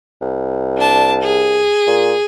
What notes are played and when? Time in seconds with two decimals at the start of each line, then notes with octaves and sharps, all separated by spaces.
0.21 C2
0.77 D4 A5
1.21 G#4
1.87 A#2